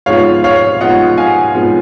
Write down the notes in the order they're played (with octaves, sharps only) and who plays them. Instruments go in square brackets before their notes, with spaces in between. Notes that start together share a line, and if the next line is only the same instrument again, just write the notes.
[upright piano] G#2 F3 B3 F4 C#5 F5
C#5 F5
G#2 F3 B3 F4 D#5 F#5
F5 G#5
G#2 F3 B3 F4